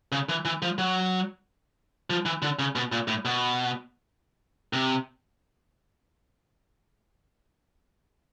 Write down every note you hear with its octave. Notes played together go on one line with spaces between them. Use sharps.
C#3
E3
E3
F3
F#3
F3
E3
D3
C#3
B2
A#2
A2
B2
C3